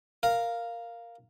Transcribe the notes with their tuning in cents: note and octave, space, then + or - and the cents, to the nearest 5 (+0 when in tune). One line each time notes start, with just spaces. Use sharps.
A#4 +0 F5 +0